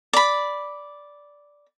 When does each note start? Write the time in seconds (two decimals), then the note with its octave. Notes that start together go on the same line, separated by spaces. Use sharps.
0.13 D5 B5